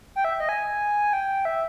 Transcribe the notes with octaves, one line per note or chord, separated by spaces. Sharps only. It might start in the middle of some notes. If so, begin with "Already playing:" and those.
G5
E5
D#5
G#5
G5
E5